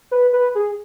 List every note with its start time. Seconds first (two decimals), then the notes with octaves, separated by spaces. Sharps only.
0.11 B4
0.33 B4
0.55 G#4